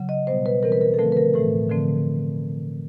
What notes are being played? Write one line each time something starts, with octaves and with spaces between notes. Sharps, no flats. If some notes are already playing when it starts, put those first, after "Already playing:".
Already playing: C#3 F#3
D#5
B2 G3 B3 C5
B4
E3 G3 C4 A#4
B4
A#4
A4
D3 F3 A3 C4 A#4
B4
A#4
A2 E3 A3 A4
D3 F3 A3 C4